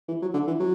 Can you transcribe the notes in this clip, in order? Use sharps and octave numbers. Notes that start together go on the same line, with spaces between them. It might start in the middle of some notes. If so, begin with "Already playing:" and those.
E3
F#3
D3
E3
F#3